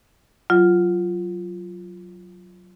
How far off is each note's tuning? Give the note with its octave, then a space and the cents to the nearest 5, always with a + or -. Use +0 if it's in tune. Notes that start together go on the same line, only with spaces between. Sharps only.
F#3 +0 F4 -5